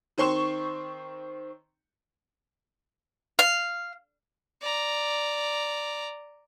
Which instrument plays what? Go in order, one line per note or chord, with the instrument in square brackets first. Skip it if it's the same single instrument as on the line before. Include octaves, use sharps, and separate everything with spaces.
[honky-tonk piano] D#3 C4 C6 C#6 E7
[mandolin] F5
[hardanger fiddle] D5 A#5